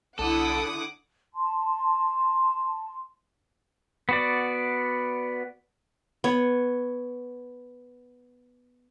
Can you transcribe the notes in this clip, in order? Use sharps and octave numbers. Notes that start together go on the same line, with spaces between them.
C2 D3 E4 A4 F#5 D6 D#6
A5 C6
B3 F#4 D5
B3 C#5